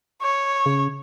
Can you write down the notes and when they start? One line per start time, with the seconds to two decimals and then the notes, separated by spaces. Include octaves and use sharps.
0.22 C#5
0.66 C#3